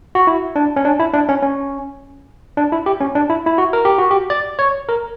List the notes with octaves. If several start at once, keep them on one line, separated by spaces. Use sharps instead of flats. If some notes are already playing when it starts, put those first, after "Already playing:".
F#4
E4
D4
C#4
D4
E4
D4
C#4
C#4
D4
E4
G4
C#4
D4
E4
E4
F#4
A#4
G4
F#4
G4
D5
C#5
A#4